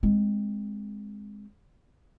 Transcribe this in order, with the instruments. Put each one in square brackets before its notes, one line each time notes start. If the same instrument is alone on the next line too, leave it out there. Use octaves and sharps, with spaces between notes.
[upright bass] G#3 C4